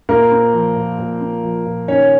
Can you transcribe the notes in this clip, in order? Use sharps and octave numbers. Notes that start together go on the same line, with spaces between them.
A#2 A#3 A#4
C4
F3
A#2
A#2
C4
F3
A#2
D#3 C#4 C#5